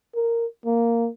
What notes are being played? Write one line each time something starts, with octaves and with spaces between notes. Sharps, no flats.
A#4
A#3